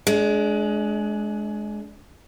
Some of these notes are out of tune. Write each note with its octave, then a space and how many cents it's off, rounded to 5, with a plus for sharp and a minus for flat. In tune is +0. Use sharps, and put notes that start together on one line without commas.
G#3 +25 D4 -10